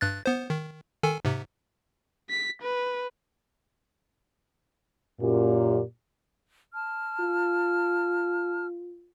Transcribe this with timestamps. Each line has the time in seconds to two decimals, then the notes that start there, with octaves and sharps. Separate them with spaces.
0.01 G2 F#6 A6
0.26 B3 C5
0.50 D#3
1.03 D#3 A4 G#5
1.25 G#2 C3
2.30 B6
2.62 B4
5.21 F#2 A#2 G4
6.74 A5 F6
7.20 F4